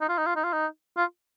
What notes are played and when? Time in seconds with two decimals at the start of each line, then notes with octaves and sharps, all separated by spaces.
0.01 D#4
0.09 F4
0.18 D#4
0.26 F4
0.36 D#4
0.44 F4
0.53 D#4
0.97 F4